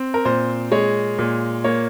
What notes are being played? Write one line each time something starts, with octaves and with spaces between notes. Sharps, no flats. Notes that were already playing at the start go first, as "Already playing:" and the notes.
Already playing: C4
A#4
A#2 C5
G#3 C#5
A#2
A#3 C#5